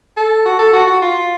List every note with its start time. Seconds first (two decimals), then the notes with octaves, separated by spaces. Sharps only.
0.17 A4
0.45 F#4
0.59 A4
0.73 F#4
0.87 F#4
1.02 F4